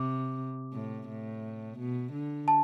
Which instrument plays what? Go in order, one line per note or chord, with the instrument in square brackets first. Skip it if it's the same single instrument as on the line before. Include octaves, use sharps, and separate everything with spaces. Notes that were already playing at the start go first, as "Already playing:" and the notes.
Already playing: [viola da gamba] C3 [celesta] D6
[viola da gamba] A2
A2
B2
D3
[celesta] A5